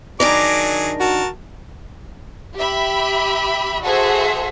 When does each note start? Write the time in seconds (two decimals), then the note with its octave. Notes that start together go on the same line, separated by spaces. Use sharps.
0.20 D#3 F#3 D4 G#4 D5 A#5 D6
1.00 F#4 A#4 A5
2.56 G4 E5 B5
3.82 F#4 G#4 A4 C5 E5